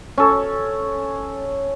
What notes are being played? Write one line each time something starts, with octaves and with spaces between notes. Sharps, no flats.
C#4 A4